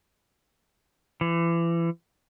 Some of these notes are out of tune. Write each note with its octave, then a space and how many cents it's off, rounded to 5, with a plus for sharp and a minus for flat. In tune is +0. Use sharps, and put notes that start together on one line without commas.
E3 +35